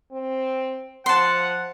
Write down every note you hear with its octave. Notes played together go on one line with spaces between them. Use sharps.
C4
F3 F#5 A5 C6